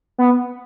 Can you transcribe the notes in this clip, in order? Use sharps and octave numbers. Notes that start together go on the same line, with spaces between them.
B3